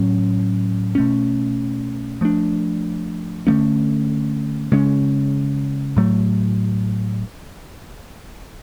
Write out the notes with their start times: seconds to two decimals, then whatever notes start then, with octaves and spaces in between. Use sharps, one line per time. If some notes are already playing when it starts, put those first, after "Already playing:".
Already playing: A2 F#3 C#4
0.95 B2 A3 C#4
2.21 F3 A3 D4
3.47 D3 F#3 A3 C#4
4.72 C#3 G#3 C#4
5.97 A2 F#3 A3